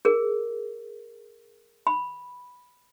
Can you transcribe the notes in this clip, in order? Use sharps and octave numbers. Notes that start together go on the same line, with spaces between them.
G#4 A#4
B5